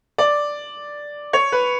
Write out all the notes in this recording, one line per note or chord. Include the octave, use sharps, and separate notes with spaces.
D5
C#5
B4